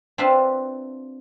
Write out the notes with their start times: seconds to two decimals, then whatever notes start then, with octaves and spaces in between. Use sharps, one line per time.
0.18 C4 D4 F4 B4 E5 F5